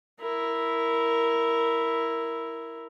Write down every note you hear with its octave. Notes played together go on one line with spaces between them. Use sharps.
E4 A#4